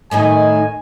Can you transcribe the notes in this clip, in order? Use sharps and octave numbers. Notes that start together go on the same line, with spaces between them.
A2 D#3 D#4 G#5